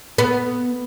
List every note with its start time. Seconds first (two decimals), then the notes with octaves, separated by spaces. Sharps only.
0.18 B3